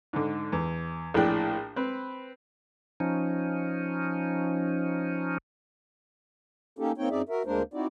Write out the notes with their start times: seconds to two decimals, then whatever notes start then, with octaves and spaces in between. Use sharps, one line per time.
0.13 G#2 D3
0.52 E2
1.14 A#1 A2 D4 G#4 G5 F#6
1.76 C4 B4
3.00 F3 C#4 D#4
6.79 A#3 C#4 D#4 G4 A4
6.98 A#3 C4 D#4 C#5 G5
7.10 F#2 C4 D#4 G#4 D5 E5
7.29 F#4 A#4 E5
7.46 D2 G#3 A#3 D4 A#4 C5
7.74 C4 D#4 E4 F#4 D5